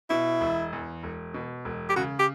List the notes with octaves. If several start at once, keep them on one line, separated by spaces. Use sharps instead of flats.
B2 E4
E1
E2
E1
B2
E1
G4
C#3 F#4
G4